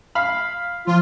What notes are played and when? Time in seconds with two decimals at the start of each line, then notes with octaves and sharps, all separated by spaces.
0.15 F5 B5
0.87 F3 F4